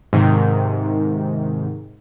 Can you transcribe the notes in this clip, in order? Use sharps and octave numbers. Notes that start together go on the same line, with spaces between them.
G#2 C3 D#3